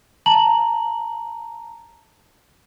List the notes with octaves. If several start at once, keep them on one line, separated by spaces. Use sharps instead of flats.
A5 A#5 F#7